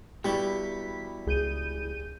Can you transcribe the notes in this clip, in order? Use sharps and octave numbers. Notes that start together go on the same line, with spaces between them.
B2 E3 G3 C#6 B6
C#2 G#4 G6 D#7